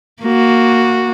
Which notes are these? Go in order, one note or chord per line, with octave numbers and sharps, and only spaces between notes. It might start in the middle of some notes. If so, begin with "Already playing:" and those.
A#3 F#4